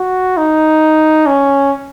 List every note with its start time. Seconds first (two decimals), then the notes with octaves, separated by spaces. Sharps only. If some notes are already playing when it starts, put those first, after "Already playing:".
Already playing: F#4
0.37 D#4
1.27 C#4